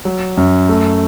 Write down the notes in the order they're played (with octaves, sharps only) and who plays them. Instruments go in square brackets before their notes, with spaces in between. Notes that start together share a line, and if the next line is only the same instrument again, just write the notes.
[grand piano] F#3
F#2
A3